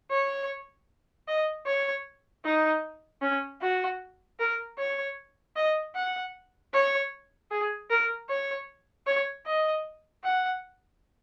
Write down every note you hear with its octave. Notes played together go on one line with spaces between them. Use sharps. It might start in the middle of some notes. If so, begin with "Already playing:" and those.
C#5
D#5
C#5
D#4
C#4
F#4
A#4
C#5
D#5
F#5
C#5
G#4
A#4
C#5
C#5
D#5
F#5